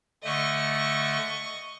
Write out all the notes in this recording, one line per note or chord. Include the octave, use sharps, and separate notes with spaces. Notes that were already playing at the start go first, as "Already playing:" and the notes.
D3 A3 D#5 C#6